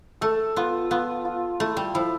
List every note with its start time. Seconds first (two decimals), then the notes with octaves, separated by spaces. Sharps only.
0.21 A3 A4
0.56 B3 F4
0.90 B3 F4
1.25 F4
1.60 A3 E4
1.77 G3
1.94 F3 E4